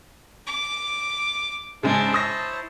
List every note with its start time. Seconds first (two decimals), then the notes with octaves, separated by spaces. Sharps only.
0.47 D6
1.83 G#2 C#3 G#3 D4 E4 C5 A5
2.14 C#5 D#6 A#6